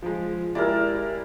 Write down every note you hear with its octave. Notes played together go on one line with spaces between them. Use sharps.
F3 G#3
G#3 E4 G4 A#4 D5